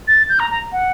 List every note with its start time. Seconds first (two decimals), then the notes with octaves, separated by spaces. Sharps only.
0.08 A6
0.29 G6
0.40 A#5
0.51 A#5
0.72 F#5